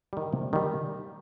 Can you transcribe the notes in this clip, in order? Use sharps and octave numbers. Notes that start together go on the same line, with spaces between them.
D#3 G3
C3
D#3 G3